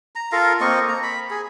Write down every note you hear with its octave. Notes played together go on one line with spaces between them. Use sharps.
A#5
F4 A4 A#4 F5
A#3 C4 D#5 C#6
A#5
B5
G#4